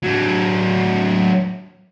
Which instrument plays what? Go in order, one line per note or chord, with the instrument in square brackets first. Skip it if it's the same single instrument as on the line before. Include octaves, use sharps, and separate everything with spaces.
[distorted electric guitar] F#3 D4